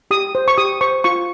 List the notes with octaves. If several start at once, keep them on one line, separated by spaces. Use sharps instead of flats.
G4 D#6
C5
C#6
G4 D#6
C5 C#6
F4 C#6